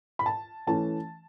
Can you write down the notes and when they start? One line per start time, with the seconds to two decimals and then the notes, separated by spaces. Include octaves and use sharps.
0.19 B5
0.26 A5
0.67 E3 A3 C#4 A5